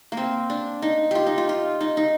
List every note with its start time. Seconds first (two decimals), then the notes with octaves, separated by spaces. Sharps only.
0.12 A#3
0.17 C4
0.50 D4
0.82 D#4
1.11 F4 G4
1.27 D#4
1.38 F4
1.49 F4
1.81 D#4
1.97 D#4